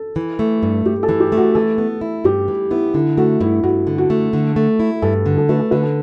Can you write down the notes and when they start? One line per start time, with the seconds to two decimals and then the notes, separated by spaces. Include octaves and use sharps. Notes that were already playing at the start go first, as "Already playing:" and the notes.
Already playing: A4
0.16 E3
0.39 A3
0.63 G2
0.86 G2 G4
1.03 A4
1.09 E3
1.20 G4
1.32 A3 F#4
1.55 E3 A4
1.78 B3
2.01 E4
2.24 G2 G4
2.48 E3
2.71 B3 E4
2.94 D3 E4
3.17 A3 F#4
3.40 G2 E4
3.63 G2 F#4
3.87 D3
3.98 F#4
4.10 A3
4.33 D3
4.56 A3
4.80 E4
5.02 G2 A4
5.26 D3
5.37 A4
5.49 A3 B4
5.59 A4
5.71 D3 B4
5.82 A4